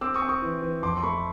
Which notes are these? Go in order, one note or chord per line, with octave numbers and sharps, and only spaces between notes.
C4 D6 E6
C#6 D#6
C4
C#6 D#6
E3
E3
F2 C6 D6
C6
A3 B5 C#6